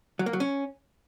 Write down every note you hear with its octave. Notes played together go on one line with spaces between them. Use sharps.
F#3
A#3
F#3
C#4